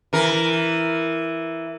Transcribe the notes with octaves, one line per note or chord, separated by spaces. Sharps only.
E3 A#4